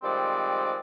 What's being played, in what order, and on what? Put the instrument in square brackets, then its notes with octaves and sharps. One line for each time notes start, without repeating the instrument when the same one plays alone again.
[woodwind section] D#3 F3 G3 G#3 C4 D5